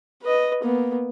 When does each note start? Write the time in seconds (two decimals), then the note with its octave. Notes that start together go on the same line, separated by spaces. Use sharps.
0.22 B4 D#5
0.63 A#3 B3